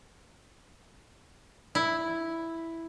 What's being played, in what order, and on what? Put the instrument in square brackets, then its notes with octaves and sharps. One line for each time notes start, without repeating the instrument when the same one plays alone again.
[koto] E4